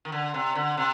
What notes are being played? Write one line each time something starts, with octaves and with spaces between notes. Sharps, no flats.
D#3
D3
C3
D3
C3